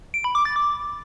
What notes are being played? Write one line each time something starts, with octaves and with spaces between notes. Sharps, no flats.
D7
B5
D6
A6
D6